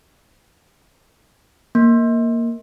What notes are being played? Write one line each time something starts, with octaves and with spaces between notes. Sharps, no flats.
A#3